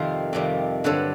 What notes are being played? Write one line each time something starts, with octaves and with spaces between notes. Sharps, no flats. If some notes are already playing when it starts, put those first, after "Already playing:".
Already playing: F2 C3 D#3 G3 A#4 C5
F2 C3 D#3 G3
G2 D3 F#3 A4 B4